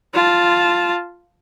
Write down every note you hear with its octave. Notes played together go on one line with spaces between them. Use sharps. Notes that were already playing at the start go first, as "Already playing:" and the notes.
F4 A5